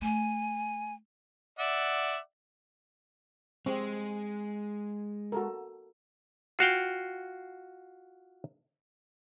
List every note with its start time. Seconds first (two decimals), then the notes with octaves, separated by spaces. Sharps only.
0.02 A3 G#5
1.59 D5 E5 F#5
3.66 G#3 C4
5.32 F#4 A4 A#4
6.59 F4 F#4 F5 G5